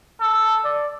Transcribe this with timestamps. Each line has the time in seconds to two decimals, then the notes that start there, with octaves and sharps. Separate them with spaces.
0.21 A4
0.64 D5